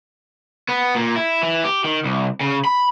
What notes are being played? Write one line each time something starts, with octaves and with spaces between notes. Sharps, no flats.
B3
A#2
E4
E3
G4
D#3
C2
C#3
B5